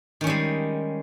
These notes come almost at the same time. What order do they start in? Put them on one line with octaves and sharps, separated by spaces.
D#3 C#4 G3 G#3